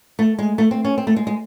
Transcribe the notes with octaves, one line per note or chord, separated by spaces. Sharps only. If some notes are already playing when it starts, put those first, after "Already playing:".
A3
G#3
A3
C4
C#4
C4
A3
G#3
G#3